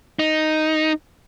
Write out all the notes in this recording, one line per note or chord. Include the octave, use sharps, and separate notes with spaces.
D#4